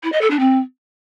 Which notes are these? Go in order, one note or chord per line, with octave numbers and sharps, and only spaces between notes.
E4
D#5
A4
D4
C4